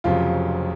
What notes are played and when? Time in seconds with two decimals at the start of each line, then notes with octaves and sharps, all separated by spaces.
0.04 F1 F2 C#3 F#3 F4